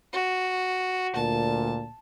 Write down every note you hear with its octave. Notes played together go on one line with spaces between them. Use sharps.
F#4
D2 A#2 A5